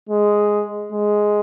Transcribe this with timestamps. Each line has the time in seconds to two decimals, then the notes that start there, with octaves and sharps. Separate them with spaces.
0.09 G#3
0.92 G#3